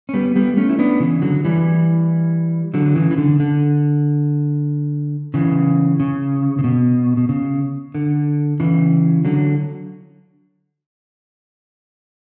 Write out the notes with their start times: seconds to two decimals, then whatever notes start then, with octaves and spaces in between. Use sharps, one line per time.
0.09 C#4
0.14 G3 B3
0.36 G3 B3
0.57 A3 C#4
0.70 E4
0.78 B3 D4
1.00 C#3 E3
1.22 D3 F#3
1.45 E3 G3
2.74 D3 F#3
2.95 C#3 E3
3.11 E3
3.18 D3
3.40 D3
5.34 C#3 E3
6.00 C#3
6.59 C#3
6.64 B2
7.17 B2
7.29 C#3
7.95 D3
8.60 C#3 E3
9.25 D3 F#3